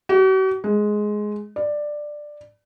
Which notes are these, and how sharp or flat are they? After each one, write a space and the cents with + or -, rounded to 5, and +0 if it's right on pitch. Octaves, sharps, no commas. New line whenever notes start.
F#4 +45
G#3 +10
D5 +10